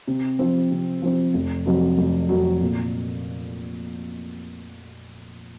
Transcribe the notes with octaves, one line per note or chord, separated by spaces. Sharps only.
C3
F3 C4
C3
F3 C4
F1
F2 C3 F#3
F1
F2 C3 F#3
A#2